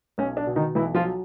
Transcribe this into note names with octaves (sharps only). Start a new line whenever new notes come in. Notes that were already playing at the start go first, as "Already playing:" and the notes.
B1 C#4
D4
B2
D#3 D#4
B1 E3 E4
F3 F4
F#3